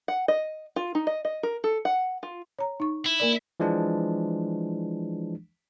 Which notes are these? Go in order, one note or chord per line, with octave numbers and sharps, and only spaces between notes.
F#5
D#5
F4
D#4
D#5
D#5
A#4
A4
F#5
F4
C#5 A#5
D#4 C#6
E4
A#3 A#4 D5
E3 F3 G#3 D4